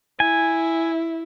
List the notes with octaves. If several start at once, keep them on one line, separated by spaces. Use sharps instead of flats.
E4 G#5